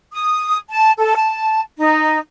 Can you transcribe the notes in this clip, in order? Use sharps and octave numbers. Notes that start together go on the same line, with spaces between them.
D#6
A5
A4
A5
D#4